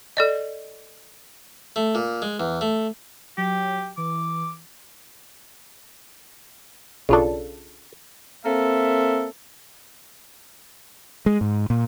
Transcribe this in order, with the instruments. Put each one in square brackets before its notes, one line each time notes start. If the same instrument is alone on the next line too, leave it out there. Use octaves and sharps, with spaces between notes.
[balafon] A4 D5 D#5
[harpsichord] A3
A#2
G#3
E2
A3
[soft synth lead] F#3 [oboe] G4
[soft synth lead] E3 [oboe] D6
[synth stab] B1 F4 A4 [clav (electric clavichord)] C#3 D4
[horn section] A#3 C4 A4 E5
[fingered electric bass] G#3
G#2
A#2